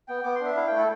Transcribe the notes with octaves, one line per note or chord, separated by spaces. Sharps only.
B3 G5
B3 D6
C6
D4 E5
E4 F5
A3 G5
A4